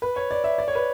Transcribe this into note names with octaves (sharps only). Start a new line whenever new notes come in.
B4
C#5
D5
E5
D5
C#5
B4